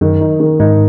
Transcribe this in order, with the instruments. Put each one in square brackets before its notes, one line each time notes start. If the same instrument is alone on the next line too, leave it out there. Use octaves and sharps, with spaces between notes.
[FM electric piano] F#2 [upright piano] D#3
[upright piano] D#4
D#3
[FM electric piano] G#2 [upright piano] D#4